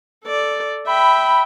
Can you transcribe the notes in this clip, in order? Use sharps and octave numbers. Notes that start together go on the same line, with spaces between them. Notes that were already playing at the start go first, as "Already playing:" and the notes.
A4 D5
E5 G5 B5